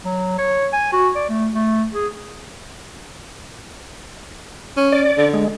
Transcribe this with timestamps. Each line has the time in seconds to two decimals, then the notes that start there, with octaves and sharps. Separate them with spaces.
0.04 F#3
0.39 C#5
0.73 G#5
0.93 F#4
1.16 D5
1.29 A3
1.55 A3
1.94 G#4
4.77 C#4
4.92 D5
5.17 D3
5.33 G#3